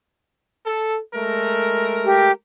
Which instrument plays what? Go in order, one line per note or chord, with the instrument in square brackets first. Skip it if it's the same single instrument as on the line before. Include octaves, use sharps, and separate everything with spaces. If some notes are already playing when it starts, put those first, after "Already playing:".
[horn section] A4
G#3 A3 A#4
[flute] G4